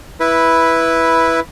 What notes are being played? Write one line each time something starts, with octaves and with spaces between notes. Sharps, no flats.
E4 B4